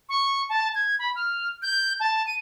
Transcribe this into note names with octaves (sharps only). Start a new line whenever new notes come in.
C#6
A5
G#6
B5
F6
G6
A5
D#7